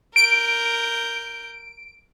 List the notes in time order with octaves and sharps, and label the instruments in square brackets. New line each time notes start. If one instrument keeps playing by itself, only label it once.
[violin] A#4 G6 [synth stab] D7